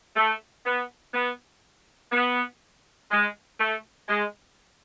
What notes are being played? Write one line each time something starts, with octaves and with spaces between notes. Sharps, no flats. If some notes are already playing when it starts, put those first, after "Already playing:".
A3
B3
B3
B3
G#3
A3
G#3